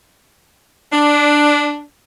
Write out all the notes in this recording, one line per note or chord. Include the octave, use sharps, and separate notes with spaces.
D4